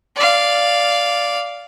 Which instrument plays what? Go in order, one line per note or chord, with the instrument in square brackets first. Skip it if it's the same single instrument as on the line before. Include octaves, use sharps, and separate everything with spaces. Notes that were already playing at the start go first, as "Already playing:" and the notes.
[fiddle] D5 F5